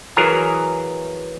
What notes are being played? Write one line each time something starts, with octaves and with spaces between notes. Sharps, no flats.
E3 F#3 G#4 A#4 G#5 A#5